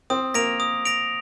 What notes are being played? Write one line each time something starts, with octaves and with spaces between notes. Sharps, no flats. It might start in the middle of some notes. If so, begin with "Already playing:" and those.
C4 D#6
A#3 A#6 D7 F7
D#6
A#6 D7 F7